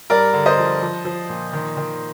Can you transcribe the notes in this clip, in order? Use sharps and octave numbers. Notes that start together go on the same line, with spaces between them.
G2 A#4 D5
D3
C5 D#5
F3
F3
F3
A#2
D#3
D#3